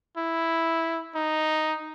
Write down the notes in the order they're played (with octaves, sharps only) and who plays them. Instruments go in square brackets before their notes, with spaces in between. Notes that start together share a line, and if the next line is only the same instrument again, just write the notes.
[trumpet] E4
D#4